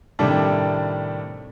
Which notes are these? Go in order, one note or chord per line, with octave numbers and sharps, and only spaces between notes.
A2 C3 D#3 G3 D4 A4